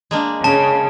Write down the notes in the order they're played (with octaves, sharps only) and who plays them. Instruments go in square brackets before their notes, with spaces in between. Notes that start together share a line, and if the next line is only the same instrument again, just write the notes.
[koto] G#3 A#3 D4
[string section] C#3 [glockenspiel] A5